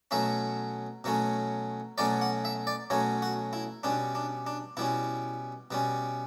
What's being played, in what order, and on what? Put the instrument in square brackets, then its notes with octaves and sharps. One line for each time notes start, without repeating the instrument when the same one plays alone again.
[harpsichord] B2 F#3 A3 C#4 E5
B2 F#3 A3 C#4
B2 F#3 A3 C#4 D5
F#5
E5
D5
B2 F#3 A3 C#4 C#5
F#4
E4
B2 G3 C#4 D4
D4
D4
B2 G3 C#4 E4
B2 G3 C#4